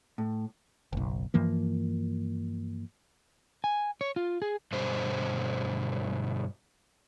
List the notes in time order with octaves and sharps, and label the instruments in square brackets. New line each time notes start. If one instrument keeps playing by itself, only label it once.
[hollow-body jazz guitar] A2
[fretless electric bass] F#1 B1
G2 E3 F3 A#3
[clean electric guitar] G#5
C#5
F4
G#4
[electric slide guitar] G2 B2 D3 G4 C5